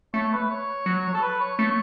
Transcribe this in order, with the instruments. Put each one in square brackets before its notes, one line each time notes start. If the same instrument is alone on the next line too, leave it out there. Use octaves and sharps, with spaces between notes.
[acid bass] A3 [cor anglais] C#5
[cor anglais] B4
C#5
[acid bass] F#3
[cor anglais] A4
B4
C#5
[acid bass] A3 [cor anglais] C#5